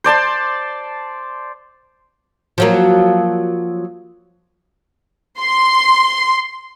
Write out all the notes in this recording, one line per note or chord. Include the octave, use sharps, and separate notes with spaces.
C5 D5 A5 C6
F3 F#3 A#3
C6